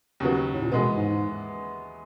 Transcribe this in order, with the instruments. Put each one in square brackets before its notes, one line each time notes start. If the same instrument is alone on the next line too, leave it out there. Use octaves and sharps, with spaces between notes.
[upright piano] D#2 C#3 F#3 B3
[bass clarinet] A2
A#2
[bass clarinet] B2 [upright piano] E3 G#3 B3
[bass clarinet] G#2
G#2